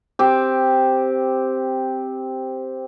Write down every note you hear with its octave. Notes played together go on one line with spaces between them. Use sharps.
C4 G4